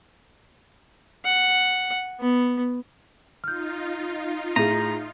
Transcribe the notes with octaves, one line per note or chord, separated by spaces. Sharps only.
F#5
B3
D#4 F4 F6 G6
A2 G#4 A#5 D#7